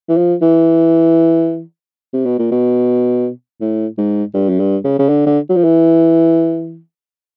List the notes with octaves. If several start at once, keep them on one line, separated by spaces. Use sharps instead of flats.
E3
F3
E3
C3
B2
A#2
B2
A2
G#2
G2
F#2
G2
C#3
C#3
D3
D3
F#3
F3
E3